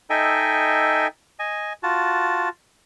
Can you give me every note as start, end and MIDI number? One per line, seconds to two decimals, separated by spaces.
0.10 1.07 63
0.10 1.07 69
0.10 1.07 75
0.10 1.07 76
0.10 1.07 79
0.10 1.07 80
1.39 1.73 75
1.39 1.73 80
1.83 2.49 65
1.83 2.49 66
1.83 2.49 81